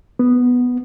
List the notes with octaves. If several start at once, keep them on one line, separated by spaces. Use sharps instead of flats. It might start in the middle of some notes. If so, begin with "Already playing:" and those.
B3